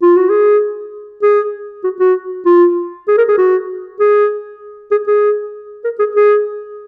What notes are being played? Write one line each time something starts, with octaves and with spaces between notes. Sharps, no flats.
F4
F#4
G#4
G#4
F#4
F#4
F4
G#4
A#4
G#4
F#4
G#4
G#4
G#4
A#4
G#4
G#4